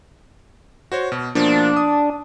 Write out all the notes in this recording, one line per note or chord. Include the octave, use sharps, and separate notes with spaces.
F#4 C5 C#5
B2
B2 F3 A#3 D4
D#6